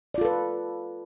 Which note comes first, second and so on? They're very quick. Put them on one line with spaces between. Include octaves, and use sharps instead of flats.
D5 F4 A4 B4